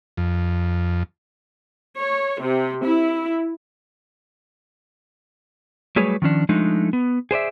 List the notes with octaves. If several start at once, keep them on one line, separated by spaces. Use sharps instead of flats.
F2
C#5
C3
E4
F#3 G3 A3 G#4 B4 C#5
D#3 F3 C#4 D4
F3 G#3 A3 D4 D#4
B3
G#4 C5 D5 E5